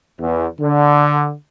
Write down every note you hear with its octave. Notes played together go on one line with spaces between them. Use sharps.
E2
D3